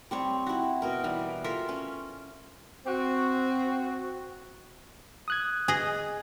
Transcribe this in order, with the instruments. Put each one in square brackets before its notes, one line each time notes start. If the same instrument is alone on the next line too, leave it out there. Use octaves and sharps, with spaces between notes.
[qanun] G3 C4 C#5
E4 F#4
B2 A#4
E3 G3
F4 A4 A#4 E5
C#4
[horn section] C4 F#4
[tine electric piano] D#6 F#6 G#6
[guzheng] G#4 D#5